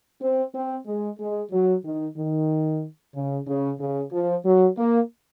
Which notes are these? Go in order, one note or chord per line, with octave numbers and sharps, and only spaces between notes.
C4
C4
G#3
G#3
F#3
D#3
D#3
C#3
C#3
C#3
F3
F#3
A#3